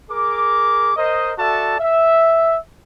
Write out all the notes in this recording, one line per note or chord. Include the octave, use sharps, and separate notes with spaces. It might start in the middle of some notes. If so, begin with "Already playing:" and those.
G#4 A#4 D6
A#4 C5 D#5
F#4 A4 D5 E5 A5
E5